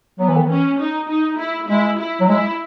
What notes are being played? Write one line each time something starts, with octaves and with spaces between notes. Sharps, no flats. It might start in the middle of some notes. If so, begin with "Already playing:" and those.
F#3 B3
E3
D#3
E3 C#4
D#4
D#4
E4
G#3 E4
E4
F#3
G#3 E4